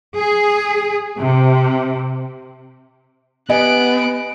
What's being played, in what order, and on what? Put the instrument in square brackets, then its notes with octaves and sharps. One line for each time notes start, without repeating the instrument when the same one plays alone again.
[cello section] G#4
C3
[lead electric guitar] B3 [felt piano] G4 D#5 G#5 [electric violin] F#6 D7